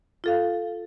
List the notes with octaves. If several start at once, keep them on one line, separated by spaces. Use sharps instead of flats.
F4 A4 F5